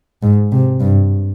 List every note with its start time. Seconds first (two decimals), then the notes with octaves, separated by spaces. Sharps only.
0.23 G#2
0.52 C3
0.80 G2